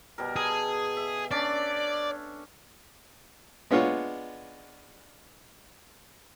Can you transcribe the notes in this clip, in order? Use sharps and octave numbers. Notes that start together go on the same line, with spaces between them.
B2 G3 A#4
G#4 A4
E5
C#4 D4 D5 D6
G#3 B3 D4 F4 C#5